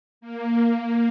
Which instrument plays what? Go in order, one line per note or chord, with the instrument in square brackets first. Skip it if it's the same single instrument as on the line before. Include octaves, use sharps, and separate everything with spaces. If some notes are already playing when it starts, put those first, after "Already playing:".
[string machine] A#3